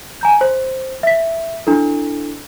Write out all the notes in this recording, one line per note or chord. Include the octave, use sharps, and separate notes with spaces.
G#5 A#5 G6
C5
E5 B6
D4 E4 A4